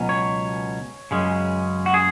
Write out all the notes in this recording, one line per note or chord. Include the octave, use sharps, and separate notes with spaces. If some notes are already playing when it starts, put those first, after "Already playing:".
Already playing: C#2 B2 F#3 C#4
C#5
F#2 C#3 G#3 C#4
F#4
G#4